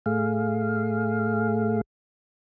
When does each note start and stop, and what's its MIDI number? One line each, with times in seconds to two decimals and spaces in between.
0.06 1.81 45
0.06 1.81 57
0.06 1.81 68
0.06 1.81 77